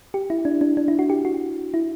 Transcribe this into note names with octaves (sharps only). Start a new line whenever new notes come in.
G4
E4
D4
D4
D4
E4
F#4
G4
F#4
E4